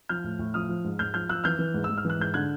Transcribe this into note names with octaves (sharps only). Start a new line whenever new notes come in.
F3 F6 G6
A2
A2
F3 D#6 F6
F3
G#2
G#2 F6 G6
F3 F6 G6
F3 E6 F#6
E3 F6 G6
E3
G#2
E6
G#2
F6
E3
F#6
G#2 G6
D3 F#6 G#6